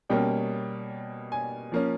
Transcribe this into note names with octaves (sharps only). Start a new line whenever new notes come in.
B2 G3 A#3 C#4 G5
G#5
F3 A#3 C#4